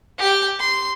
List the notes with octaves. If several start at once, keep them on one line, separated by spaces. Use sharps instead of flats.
G4 G5
C6